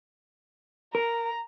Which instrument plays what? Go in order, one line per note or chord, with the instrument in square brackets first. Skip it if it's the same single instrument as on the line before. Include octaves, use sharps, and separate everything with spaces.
[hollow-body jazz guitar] A#4 [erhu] A#5